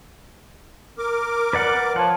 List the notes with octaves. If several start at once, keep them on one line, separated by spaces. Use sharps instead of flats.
A#4 D6
B4 D5 F#5
F3 C#5 F#5